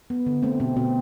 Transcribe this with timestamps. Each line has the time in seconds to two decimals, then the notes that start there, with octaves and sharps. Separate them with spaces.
0.10 B3
0.26 D3
0.43 A3 C4
0.60 B2 C4
0.77 B2 C4